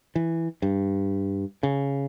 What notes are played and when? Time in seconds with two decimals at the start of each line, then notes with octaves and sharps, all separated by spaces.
0.15 E3
0.62 G2
1.63 C#3